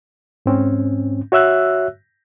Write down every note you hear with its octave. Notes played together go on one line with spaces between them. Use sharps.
G#2 C4 C#4
F#4 C#5 E5 E6 F#6